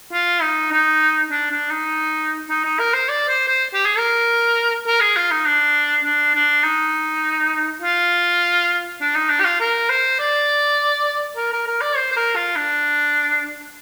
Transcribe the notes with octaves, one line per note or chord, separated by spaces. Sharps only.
F4
D#4
D#4
D4
D4
D#4
D#4
D#4
A#4
C5
D5
C5
C5
G4
G#4
A#4
A#4
G#4
F4
D#4
D4
D4
D4
D#4
F4
D4
D#4
D4
G4
F4
A#4
C5
D5
A#4
A#4
A#4
D5
C5
C5
A#4
F4
D4